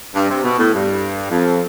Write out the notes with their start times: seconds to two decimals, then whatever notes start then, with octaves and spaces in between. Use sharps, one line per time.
0.15 G2
0.30 C3
0.44 B2
0.58 A2
0.73 G2
1.31 F2